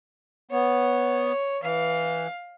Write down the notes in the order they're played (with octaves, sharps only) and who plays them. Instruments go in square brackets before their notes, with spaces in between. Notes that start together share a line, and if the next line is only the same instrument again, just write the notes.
[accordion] B3 [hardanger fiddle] C#5
[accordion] E3 [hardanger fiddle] F5